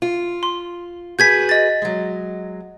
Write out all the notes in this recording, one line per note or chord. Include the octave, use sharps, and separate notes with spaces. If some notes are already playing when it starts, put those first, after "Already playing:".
F4
C6
F#4 G#4 B4 G6 G#6 B6
D#5 A6
F#3 G#3